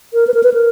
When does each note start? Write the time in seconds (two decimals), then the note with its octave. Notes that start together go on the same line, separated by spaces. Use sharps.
0.14 A#4
0.27 B4
0.34 A#4
0.43 B4
0.54 A#4